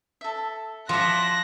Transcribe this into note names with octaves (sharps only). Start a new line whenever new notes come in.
A4 E5
F3 F#4 E5 F5 C6 D6 F#6 A#6